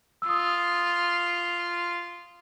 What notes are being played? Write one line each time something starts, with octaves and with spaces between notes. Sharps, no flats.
E6
F4 D#6